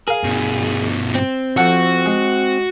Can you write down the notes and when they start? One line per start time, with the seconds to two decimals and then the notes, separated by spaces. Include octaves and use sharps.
0.08 G#4 A#4 F5
0.24 G2 B2
1.15 C4
1.57 F2 F#4 A4 F#5
2.06 G#3